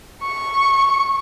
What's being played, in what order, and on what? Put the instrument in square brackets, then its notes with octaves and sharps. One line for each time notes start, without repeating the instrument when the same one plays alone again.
[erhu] C#6